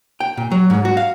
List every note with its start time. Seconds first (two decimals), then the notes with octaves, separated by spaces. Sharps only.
0.20 G5
0.37 A#2
0.51 F#3
0.70 G#2
0.85 F#4
0.97 F5